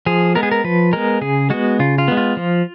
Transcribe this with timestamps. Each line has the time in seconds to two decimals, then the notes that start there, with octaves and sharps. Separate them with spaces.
0.06 F3 G#4
0.35 G#3 B3 A#4
0.43 G#4
0.52 A#4
0.64 F3 B4
0.93 G#3 B3 A#4
1.21 C#3 G#4
1.50 G#3 B3 F#4
1.79 C#3 F4
1.98 F4
2.08 G#3 B3
2.17 F4
2.37 F3